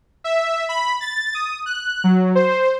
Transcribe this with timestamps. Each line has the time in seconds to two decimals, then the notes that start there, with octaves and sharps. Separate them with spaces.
0.24 E5
0.69 B5
1.01 A6
1.34 D#6
1.66 F#6
2.04 F#3
2.35 C5